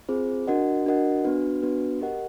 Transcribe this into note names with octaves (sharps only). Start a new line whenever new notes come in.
C4 F4 G#4 C5
D4 F#4 A#4 D#5 F#5
D4 F#4 A#4 D#5 F#5
B3 D4 F#4 B4
B3 D4 F#4 B4
G4 A#4 D#5 F#5